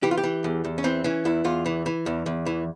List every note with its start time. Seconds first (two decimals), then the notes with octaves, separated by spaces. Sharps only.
0.03 E3 G4
0.11 F4
0.17 G4
0.24 E3
0.44 E2
0.64 E2
0.78 C#4
0.84 E3 C4
1.04 E3 C#4
1.25 E2 E4
1.45 E2 F4
1.66 E3
1.86 E3
2.06 E2
2.26 E2
2.46 E3